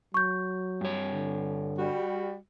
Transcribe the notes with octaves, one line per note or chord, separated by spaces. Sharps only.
F#3 C#6 G6
G2 C#5
D3
G3 F#4